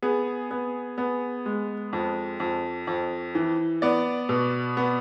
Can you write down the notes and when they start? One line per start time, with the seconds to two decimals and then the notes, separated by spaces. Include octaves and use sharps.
0.02 B3 G#4
0.51 B3
0.98 B3
1.46 G#3
1.93 F2
2.40 F2
2.87 F2
3.35 E3
3.82 B3 D5
4.29 B2
4.77 B3